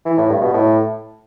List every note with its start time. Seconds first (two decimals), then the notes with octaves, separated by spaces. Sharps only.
0.05 E3
0.17 A2
0.29 G2
0.41 B2
0.53 A2